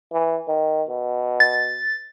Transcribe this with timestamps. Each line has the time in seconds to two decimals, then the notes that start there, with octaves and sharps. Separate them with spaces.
0.12 E3
0.48 D#3
0.89 B2
1.40 A6